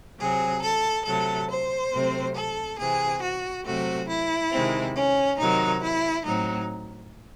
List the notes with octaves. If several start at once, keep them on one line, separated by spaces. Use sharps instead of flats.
C3 F#3 C4 G#4
A4
C3 F#3 A3 A4
C5
C3 F#3 A3 C4
A4
C3 E3 C4 G#4
F#4
C3 F#3 A3 C4 F#4
E4
C3 D#3 G#3 C4
C#4
C3 D#3 F#3 D#4
E4
A2 F#3 C4 D#4